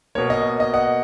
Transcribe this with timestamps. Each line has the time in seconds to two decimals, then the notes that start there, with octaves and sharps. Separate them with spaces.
0.15 B2 A#3 C#5
0.30 D#5
0.60 D#5
0.74 D#5 F#5